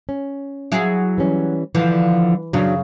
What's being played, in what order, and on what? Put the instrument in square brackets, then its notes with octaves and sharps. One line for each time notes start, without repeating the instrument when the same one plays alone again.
[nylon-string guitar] C#4
[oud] F#3 E4 G#4
[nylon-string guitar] E3 G3 C#4
[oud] D3 F3 [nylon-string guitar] E3
[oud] F#2 C#3 [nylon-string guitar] F#3 D4